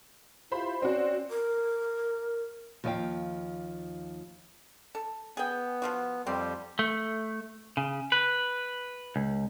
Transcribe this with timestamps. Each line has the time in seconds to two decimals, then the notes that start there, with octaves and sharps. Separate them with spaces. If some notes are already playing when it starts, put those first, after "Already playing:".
0.52 E4 F4 G4 C5 B5
0.82 C4 C#4 F#4 D5
1.30 A#4
2.84 D#2 F3 A4 D#5 F5 G5
4.95 A4
5.37 B3 G#4 G5
5.82 F3 F4 F#4
6.27 F2 G3 C4 G4
6.79 A3
7.77 C#3
8.12 B4
9.16 C#2